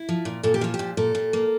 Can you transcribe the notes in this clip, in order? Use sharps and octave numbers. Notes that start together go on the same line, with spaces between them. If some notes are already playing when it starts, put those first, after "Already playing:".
Already playing: E4
F3
A#2
A#2 A4
G4
F3 F4
G4
A#2
A#2 A4
A#2
A#3